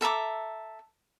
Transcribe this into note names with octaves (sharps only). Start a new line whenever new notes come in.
A4 E5 A#5 D6